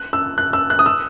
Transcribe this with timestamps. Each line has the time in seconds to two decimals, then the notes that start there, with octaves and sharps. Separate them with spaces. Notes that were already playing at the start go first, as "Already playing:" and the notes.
Already playing: F#6
0.13 E6
0.38 F#6
0.53 E6
0.70 F#6
0.79 D#6
0.86 E6